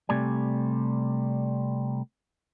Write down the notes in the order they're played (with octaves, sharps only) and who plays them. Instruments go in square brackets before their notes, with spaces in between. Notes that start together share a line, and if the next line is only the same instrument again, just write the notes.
[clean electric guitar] C3 G3 A3 D5 G#5